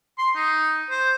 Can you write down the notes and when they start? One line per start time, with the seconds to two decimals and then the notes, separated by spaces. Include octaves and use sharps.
0.18 C6
0.35 D#4
0.90 C5